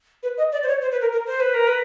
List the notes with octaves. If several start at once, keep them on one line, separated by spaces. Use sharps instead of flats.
B4
D#5
D5
C5
C#5
C5
B4
A#4
A#4
C5
B4
A#4
B4